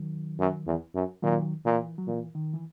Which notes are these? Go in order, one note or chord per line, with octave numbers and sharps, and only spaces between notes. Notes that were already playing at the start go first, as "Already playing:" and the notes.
Already playing: D#3 F#3
F#2
E2
F#2
A#2 D#3 F#3
A#2 E3
F#3
A#2 E3
D#3
E3